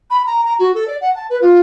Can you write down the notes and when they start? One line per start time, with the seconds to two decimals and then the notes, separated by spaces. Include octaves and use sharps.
0.10 B5
0.26 A#5
0.44 A#5
0.59 F#4
0.74 A4
0.87 D5
1.01 F#5
1.15 A5
1.30 B4
1.41 F4